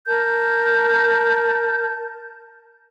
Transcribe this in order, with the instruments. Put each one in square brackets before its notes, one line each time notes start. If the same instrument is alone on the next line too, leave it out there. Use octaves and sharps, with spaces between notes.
[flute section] A#4 A5 G6